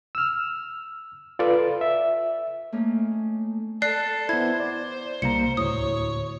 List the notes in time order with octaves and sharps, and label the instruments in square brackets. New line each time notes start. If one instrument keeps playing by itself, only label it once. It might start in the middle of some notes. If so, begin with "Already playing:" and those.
[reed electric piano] E6 F6
F4 A4 B4 D5
E5
[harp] A3 A#3 C#4 D#4
[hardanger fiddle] A4 [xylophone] D5 F#6 C7
[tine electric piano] B3 E4 [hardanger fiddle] C5 [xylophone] G#6
[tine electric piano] D5
[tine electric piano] C2 A#3 A#5 [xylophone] C#7
[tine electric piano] D2 A2 [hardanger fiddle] C#5 [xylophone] D#6